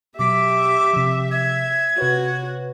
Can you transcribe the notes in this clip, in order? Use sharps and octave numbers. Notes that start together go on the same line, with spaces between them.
B2 F#3 G4 E5 D6 B6
C3 F3
E5 G#6
C3 F#4 B4 C#5